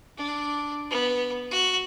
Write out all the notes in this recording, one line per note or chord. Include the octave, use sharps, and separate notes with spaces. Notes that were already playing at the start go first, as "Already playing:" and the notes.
D4
B3
F#4